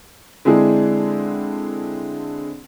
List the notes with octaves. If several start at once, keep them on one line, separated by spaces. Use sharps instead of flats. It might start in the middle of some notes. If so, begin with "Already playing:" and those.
D3 G#3 C4 D4 E4 G#4